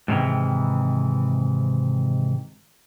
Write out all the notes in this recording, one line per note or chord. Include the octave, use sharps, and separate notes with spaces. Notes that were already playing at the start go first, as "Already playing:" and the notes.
G#2 C3 D#3 E3